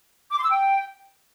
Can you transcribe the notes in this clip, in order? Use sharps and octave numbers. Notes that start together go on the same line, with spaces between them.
D6
C6
E6
G5